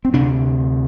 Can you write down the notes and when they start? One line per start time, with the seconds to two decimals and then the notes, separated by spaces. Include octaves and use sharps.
0.05 C4
0.13 D2 C3 D4